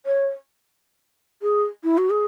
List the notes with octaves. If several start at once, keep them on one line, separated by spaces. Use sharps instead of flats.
C#5
G#4
E4
F#4
G#4